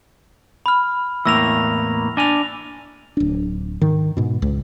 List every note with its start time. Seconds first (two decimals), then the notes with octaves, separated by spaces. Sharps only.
0.66 B5 F6
1.25 E2 A2 A#3 E6 A#6 F7
2.17 D4 G#5 A#6 F7
3.17 D1 D4
3.81 G#2 D#3
4.17 G#2 B2
4.42 C#2